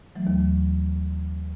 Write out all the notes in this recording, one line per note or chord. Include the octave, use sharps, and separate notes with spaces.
E3 F#3 A3
D#2